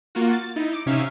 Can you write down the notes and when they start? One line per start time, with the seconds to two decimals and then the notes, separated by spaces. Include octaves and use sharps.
0.15 A#3 F4 F#4
0.32 A6
0.56 D#4 E4
0.73 D6
0.86 C3 C#4 D#4 E5 F5